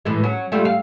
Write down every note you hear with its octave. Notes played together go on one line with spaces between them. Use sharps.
A2 E3 G#3
F#3 C#4
G3 A3 F4
F5